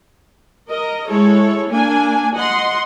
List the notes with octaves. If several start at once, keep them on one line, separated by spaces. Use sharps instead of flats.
A#4 D#5
G#3 E4 A4 C#5
A#3 D4 G#5
D#5 F#5 C6